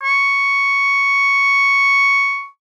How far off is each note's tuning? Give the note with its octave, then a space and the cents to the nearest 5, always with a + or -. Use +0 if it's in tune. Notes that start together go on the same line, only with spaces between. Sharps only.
C#6 +5